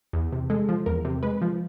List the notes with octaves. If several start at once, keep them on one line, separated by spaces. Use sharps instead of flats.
E2
C3
G#3 A4
F3
E2 A#4
C3
G#3 B4
F3